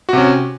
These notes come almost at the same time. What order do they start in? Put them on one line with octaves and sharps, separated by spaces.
F#4 C3 C#4